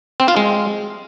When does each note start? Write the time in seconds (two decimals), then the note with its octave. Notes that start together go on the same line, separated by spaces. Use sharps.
0.20 C4
0.28 F4
0.37 G#3